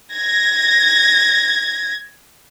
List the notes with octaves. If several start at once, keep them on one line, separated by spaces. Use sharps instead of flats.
G#6 A#6